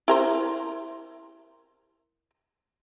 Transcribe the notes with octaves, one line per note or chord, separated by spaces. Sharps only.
E4 A#4 C5